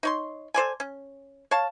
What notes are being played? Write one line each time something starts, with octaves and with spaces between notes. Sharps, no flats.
D#4 C#5 C6
A4 C5 D5 G#5
C#4
C#5 F5 A5